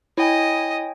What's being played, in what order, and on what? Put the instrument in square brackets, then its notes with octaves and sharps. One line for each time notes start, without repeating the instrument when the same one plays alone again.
[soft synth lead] E4 [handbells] C#5 G5 G#5 [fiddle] D#5